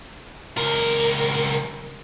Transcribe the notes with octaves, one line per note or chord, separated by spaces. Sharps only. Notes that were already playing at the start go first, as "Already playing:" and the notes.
C#2 A#4